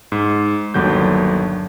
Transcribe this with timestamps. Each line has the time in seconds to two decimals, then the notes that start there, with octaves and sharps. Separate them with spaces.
0.12 G#2
0.74 G1 D#2 D3 F#3 G6